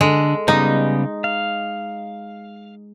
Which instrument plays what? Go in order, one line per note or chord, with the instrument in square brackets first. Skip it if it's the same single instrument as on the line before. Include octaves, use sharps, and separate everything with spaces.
[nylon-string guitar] D3 [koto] G#3
[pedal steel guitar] C#3 G3 B3 [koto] D#4 [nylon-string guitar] D#5
[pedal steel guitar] F5